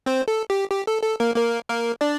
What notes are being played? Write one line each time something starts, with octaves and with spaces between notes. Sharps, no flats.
C4 C5
A4
G4
G4
A4
A4
A#3 A#4
A#3 A#4
A#3 A#4
D4 D5